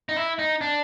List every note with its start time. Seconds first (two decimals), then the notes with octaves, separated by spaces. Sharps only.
0.09 D#4
0.17 E4
0.39 D#4
0.61 D4